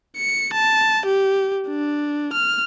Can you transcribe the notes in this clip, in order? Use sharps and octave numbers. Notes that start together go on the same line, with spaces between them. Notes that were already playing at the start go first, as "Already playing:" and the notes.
C#7
A5
G4
D4
F6